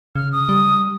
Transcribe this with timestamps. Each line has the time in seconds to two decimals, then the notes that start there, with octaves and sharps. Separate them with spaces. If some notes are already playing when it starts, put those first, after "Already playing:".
0.15 C#3 F6
0.32 D#6
0.49 G3